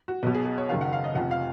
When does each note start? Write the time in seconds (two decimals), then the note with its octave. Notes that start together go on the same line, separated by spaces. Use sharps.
0.08 F#4
0.23 B1 B2 B3
0.34 G#4
0.45 G#4
0.58 C#5
0.69 F#1 F#2 D#3 F5
0.81 F#5
0.93 F5
1.04 D#5
1.15 F1 F2 F3 F#5
1.31 F5